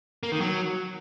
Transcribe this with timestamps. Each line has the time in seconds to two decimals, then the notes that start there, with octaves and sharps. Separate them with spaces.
0.23 A#3
0.32 D#3
0.41 F#3